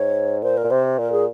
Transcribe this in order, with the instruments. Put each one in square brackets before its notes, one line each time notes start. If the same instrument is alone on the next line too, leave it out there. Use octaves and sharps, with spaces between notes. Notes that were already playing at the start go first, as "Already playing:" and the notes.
Already playing: [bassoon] G#2 [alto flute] C#5
[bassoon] A#2 [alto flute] C5
[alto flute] A#4
[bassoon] A#2
[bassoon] C3 [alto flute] C5
[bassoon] A#2 [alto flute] A#4
[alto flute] G#4